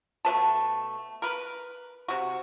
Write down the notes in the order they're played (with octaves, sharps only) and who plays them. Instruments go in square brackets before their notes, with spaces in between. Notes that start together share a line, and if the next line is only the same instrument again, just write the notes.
[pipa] B2 A3 B4 A5
A#4 B4
C3 F#4